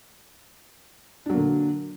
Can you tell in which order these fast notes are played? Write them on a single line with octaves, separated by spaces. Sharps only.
D4 F#3 A#3 D3